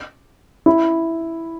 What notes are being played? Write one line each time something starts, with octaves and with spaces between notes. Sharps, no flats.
E4